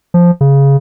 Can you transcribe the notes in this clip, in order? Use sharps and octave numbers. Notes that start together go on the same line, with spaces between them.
F3
C#3